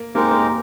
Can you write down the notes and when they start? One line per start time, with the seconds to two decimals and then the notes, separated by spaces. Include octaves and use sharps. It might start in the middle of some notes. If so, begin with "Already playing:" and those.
Already playing: A#3
0.15 G#3 A#3 C4 D#4 G4 A#4
0.31 A#3